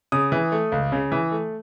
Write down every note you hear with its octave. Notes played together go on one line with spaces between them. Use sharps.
C#3 D#6
E3
A3
C#2
C#3
E3
A3